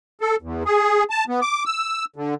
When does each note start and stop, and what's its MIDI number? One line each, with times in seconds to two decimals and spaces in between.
0.21 0.36 69
0.42 0.63 40
0.66 1.04 68
1.10 1.24 81
1.28 1.40 59
1.42 1.64 86
1.66 2.05 88
2.16 2.34 50